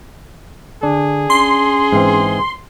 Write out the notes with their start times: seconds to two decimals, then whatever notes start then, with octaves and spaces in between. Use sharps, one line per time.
0.83 D3 D4 G#4
1.30 C#4 C6
1.92 G#2 E3 C4